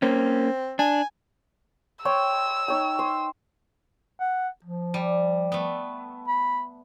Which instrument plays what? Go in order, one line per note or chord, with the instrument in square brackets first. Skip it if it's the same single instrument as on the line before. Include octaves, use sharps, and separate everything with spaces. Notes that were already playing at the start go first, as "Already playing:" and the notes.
[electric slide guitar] A#3 C#4 [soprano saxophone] C4
[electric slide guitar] D4 [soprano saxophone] G#5
[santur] C5 C#5 G5 [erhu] E6
[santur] D#4 C#5 G5
C5
[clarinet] F#5
F3
[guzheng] G3
A3 B3
[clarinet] B5